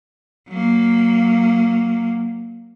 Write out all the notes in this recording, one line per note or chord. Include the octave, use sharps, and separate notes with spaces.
F#3 A#3